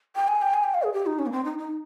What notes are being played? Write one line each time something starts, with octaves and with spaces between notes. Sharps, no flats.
G5
G#5
G5
G#5
G5
F5
G#4
G4
D#4
C#4
A#3
C4
D#4
D#4